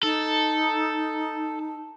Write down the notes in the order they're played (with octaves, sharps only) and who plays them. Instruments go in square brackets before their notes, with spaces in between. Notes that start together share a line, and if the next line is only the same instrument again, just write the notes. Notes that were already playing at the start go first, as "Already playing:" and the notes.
[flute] D#4 [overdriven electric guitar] A4